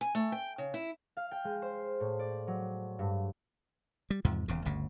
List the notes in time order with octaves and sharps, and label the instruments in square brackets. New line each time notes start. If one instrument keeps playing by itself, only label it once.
[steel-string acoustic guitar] G#5
A3
G5
C#3
E4
[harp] F5
G5
G#3
C5
A2
D5
F#3
G2
[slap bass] G3
E2 G#2 C3 F3
D#1 E2 C#3
G1 D2 C#3